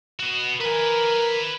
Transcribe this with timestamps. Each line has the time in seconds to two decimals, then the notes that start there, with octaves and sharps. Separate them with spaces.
0.19 B3 F#4
0.61 A#4 B4 G#5